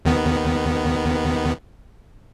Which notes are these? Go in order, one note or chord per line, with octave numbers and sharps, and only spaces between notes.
D#2 D#3 B3